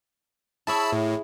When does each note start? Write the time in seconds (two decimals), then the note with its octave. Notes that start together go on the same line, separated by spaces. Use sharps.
0.67 E4 G#4 C#5 A5 B5 E6
0.93 A2